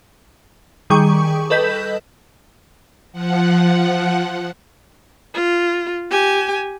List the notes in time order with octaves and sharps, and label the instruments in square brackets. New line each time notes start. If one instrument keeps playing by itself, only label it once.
[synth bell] D#3 G3 G#4 G5 C#6
A4 B4 D#5 G6 B6 E7
[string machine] F3 F#5
[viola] F4
G4 G#5